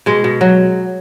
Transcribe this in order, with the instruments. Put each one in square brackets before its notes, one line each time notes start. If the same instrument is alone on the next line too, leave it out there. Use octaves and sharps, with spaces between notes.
[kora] B2 G#3
B2
F#3